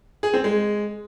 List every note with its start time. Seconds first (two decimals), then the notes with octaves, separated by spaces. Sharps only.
0.23 G#4
0.34 C4
0.44 G#3